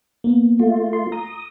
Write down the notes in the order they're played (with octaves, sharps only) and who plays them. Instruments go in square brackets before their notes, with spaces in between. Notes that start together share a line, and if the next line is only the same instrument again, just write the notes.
[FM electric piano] A#3 B3
[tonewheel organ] A3 F4
[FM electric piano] C6
[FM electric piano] A#5 [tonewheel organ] D#6